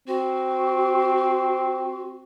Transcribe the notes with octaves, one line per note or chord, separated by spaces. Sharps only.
C4 F#4